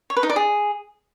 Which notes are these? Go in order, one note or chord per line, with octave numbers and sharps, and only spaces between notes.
C#5
B4
D#4
D5
G#4